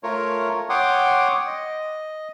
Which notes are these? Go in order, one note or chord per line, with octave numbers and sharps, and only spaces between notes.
A3 F4 A#4 C#5
C#5 F#5 G5 C6 D6 D#6
D#5